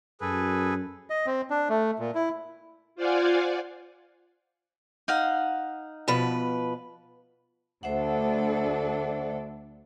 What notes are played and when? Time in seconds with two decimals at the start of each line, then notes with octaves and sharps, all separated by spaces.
0.21 F#2 G#4 A4 B4
1.10 D#5
1.26 C4
1.50 D4
1.69 A3
1.99 A#2
2.15 E4
2.95 F4 C5 D5 F5 F#5 G#5
5.08 D#4 F5 F#5
6.08 B2 F3 B4
7.83 D2 D4 A4 C5 E5 F#5